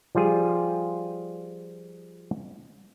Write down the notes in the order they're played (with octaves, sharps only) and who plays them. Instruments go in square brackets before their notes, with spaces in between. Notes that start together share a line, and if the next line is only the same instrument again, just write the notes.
[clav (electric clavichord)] F3 G3 F4 G#4